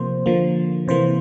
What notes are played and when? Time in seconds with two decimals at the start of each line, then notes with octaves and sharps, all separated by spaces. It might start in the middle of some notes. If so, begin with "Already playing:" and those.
Already playing: C3 F3 A#3 C5
0.26 D3 F3 A#3
0.88 C3 E3 A#3 C5